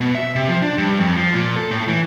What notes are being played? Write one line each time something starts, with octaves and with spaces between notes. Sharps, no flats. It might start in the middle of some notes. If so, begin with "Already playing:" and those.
B2
E5
C3
F3
D4
G2
F2
F3
A#2
A4
A2
E3